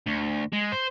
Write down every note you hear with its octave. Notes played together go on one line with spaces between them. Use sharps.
D2
G#3
C5